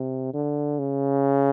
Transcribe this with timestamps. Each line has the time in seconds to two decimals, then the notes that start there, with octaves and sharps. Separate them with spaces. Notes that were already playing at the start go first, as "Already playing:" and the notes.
Already playing: C3
0.33 D3
0.79 C#3